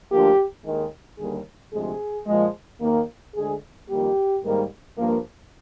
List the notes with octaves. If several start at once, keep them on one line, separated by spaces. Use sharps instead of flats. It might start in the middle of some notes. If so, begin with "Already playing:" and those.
D2 D3 F3 A#3 G4
D#2 D#3 G#3
D#2 D3 G3 A#3 G#4
D2 C3 F3 G#3 G#4
A#2 F3 G#3
D#2 D#3 A#3
D2 D3 G#3 G#4
F2 D#3 G3 A#3 G4
G#2 D#3 G3 A#3
G2 F3 A#3